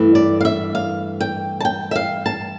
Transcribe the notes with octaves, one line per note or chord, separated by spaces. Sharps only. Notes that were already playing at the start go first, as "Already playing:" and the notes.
Already playing: G2 E3 A3
D5
F5
E5
F5
G5
A5
G5
E5
F5
A5